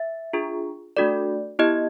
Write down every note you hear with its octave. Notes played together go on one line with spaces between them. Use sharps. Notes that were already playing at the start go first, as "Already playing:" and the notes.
Already playing: E5
D4 F4 G#4
A3 D4 F#4 A4 D5
B3 E4 G4 D#5